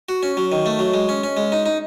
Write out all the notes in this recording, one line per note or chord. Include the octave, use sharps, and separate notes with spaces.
F#4
C#4
F#3
D#3
A3
F#3
G#3
C#4
C#4
G#3
D#4
D#4